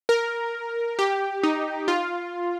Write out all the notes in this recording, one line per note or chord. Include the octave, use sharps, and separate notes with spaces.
A#4
G4
D#4
F4